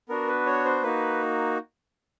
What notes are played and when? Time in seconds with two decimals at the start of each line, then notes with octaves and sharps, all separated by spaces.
0.09 B3 D4 F#4 A#4
0.28 B4
0.46 C#5
0.65 C5
0.83 A#3 D#4 F#4 B4